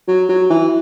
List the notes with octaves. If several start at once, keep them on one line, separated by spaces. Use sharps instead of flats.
F#3
F#3
E3